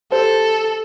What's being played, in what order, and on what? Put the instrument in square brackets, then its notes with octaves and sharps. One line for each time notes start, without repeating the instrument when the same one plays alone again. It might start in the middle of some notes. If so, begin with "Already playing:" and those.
[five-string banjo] G4 C5 [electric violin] A4